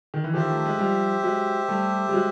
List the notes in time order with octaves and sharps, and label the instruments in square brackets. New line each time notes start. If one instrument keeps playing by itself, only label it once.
[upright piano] D#3
E3
[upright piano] D#3 F3 [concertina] G4 C5 E5
[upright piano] A3
G#3
F3 G3
F#3 G#3
G3 A3
G3
F#3 G#3